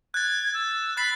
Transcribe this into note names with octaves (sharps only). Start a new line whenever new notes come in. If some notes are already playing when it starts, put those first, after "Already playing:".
F#6 G#6 A6
E6
B5 F#6 A6 C7